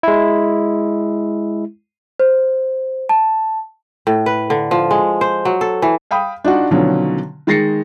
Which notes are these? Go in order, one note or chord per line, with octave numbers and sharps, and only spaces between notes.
G#3 E4
C5
A5
A2
B4
D3
F3
G#3
C5
F#3
A4
E3
F5 G5 B5 D#6
D4 D#4 F4 F#4
B2 D3 D#3 F3 F#3 C#4
D#3 G#3 A6 A#6 C7 C#7